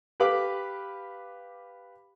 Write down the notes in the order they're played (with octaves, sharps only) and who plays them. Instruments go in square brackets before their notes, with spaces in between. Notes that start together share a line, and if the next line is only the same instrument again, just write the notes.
[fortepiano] G4 B4 F5 B5 D6